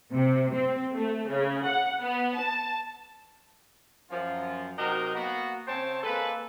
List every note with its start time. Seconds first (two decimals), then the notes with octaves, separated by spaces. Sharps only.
0.13 C3
0.55 C4
0.94 A3
1.28 C#3
1.65 F#5
2.02 B3
2.39 A5
4.11 F#2 F3 F4
4.78 C3 F#3 D#4 F#4 A#4
5.15 A#3 B3 F#4
5.68 C#3 C4 C5 C#5 G5 A5
6.03 G#3 A#3 A4 B4